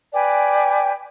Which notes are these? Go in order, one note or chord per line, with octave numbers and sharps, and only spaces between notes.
B4 D5 G5 G#5